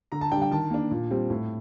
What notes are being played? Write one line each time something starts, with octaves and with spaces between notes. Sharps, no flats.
D3 A#5
A5
D4 G5
G3
G5
D#3 A5
A#3 D4
A#2
G3 C4
A2